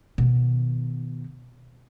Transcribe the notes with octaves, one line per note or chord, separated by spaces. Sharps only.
B2 D#3